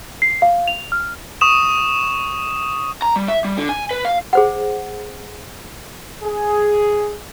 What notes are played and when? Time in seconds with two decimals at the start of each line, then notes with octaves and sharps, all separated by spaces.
0.22 C7
0.42 F5
0.68 F7
0.92 F6
1.41 C#6 D#6 E7
3.02 A#5
3.16 G3
3.28 E5
3.44 G3
3.58 D3
3.69 G#5
3.91 B4
4.05 F5
4.33 G#4 C5 F#5
6.24 G#4